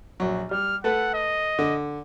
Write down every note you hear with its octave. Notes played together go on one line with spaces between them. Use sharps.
A#1 F#3
G3 F6
A3 A4 B4 F#5
D#5
D3